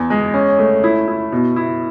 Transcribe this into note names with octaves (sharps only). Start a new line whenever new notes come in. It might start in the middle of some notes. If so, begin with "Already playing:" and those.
Already playing: E2
G#3
C#4
A3
E4
E4
B2
E4